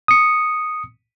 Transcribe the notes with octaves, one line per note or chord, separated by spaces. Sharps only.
D#6 C#7